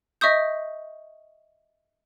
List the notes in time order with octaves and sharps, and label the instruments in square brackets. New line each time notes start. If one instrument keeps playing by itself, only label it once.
[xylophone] D#5 E5 C#6 D#6 G6